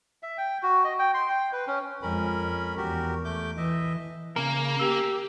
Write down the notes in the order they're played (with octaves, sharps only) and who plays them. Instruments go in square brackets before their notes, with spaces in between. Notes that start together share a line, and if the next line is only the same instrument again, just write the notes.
[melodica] E5
G5
F#4
D#5
G5
C6
G5
B4
C#4
[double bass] F2 G#3 [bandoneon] C#4 A#4 B5
[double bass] E2 [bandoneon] F#4 G4 A#4
[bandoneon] A3 D6 G6
[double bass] E3 [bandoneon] D#5 E5
[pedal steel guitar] C#3 A#4 [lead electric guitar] A#3
[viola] G4 [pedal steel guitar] E6